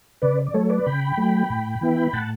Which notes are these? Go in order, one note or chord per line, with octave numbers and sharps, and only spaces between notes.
C#3 B4 D5
D5
F#3 A3 A4 C#5
B4 D5
C#3 G5 B5
F#3 A3
A2
E3 B3 E4
A2 F#5 A5